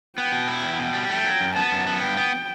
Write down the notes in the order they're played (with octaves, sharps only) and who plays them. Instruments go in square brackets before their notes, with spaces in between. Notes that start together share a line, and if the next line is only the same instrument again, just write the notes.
[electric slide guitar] B3 [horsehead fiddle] G5
[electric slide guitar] B2
E4
[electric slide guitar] E2 [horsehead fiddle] G5
[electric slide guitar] B2
G3
[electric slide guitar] A3 [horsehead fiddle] G5
[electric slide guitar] F#3
F#2
[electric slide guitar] B3 [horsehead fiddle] A5
[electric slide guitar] F#2
B3
[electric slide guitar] G2 [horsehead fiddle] G5
[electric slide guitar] B3